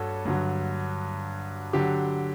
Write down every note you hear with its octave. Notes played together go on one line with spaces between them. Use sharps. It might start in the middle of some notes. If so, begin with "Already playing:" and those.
Already playing: G2 F#4 A4 C#5
G2 D3 F#3
D3 F#3 G4